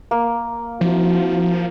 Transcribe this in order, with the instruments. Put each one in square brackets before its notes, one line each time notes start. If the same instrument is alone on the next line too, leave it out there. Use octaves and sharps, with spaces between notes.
[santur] A#3
[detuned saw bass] F3 [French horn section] C4 E4 F#4